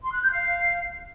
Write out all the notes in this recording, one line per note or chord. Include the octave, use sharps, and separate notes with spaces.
C6
F#6
G6
F5